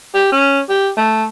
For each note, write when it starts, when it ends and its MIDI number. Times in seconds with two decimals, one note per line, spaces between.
0.14 0.30 67
0.32 0.60 61
0.69 0.90 67
0.97 1.25 57